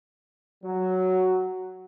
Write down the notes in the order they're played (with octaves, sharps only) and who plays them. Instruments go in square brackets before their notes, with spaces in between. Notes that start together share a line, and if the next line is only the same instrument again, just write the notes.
[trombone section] F#3